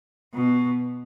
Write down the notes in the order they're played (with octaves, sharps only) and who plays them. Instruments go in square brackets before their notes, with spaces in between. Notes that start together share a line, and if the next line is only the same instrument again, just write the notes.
[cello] B2